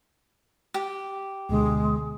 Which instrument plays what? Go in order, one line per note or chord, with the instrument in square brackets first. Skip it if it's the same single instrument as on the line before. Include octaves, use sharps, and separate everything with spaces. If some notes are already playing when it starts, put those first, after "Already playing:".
[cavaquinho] G4
[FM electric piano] D2 B2 D3 [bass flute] G#3